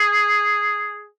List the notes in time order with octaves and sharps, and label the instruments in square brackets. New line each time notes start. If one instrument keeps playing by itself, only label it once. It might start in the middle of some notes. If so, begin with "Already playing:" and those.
Already playing: [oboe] G#4